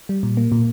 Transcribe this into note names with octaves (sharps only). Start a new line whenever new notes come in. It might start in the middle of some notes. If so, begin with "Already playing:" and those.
G3
A#2
A#3
A#2